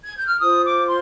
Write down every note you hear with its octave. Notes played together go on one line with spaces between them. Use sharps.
G#6
G6
F6
F4 C5 D#6
D6
C6